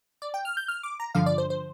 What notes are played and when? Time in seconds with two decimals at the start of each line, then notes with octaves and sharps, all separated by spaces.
0.22 D5
0.34 G5
0.45 F6
0.57 G6
0.68 F6
0.83 D6
1.00 A#5
1.15 G2 D3 F3 F5
1.26 D5
1.38 C5
1.50 C5